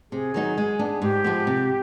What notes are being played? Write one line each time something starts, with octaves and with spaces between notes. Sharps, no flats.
C3 G#4
D#3 F#3 B3 D#4
G#3
B3 D4
G#2 G4
F3 G#3 B3
C3